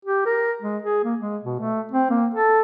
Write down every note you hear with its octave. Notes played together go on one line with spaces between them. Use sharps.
G4
A#4
G#3
G#4
A#3
G#3
B2
A3
C4
A#3
A4